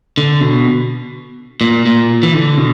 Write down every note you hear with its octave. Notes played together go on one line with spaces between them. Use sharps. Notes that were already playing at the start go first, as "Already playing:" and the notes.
D3
B2
A#2
A#2
E3
D3
B2